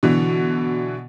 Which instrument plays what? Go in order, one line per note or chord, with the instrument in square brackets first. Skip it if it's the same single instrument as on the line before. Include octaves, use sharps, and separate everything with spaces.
[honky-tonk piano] B2 D3 E3